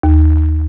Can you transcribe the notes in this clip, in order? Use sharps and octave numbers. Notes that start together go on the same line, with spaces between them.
D#2